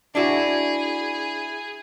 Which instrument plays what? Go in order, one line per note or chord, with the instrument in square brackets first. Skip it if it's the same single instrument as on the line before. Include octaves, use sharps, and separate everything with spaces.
[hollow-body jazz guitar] D4 E4 F#4 [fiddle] G#4